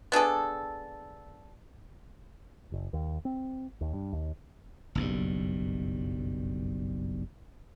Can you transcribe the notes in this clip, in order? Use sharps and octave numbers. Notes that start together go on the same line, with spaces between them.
B3 D4 G#4 A4
F#1
D#2
C4
D#2
G2
D#2
F#1 B1 G2